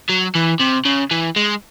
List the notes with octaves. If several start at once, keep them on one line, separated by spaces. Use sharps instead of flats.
F#3
E3
C3
C#3
E3
G#3